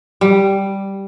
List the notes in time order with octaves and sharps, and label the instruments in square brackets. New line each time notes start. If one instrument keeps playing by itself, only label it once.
[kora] G3